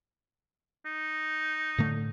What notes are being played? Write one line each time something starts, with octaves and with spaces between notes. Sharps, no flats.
D#4
A2 D3 A3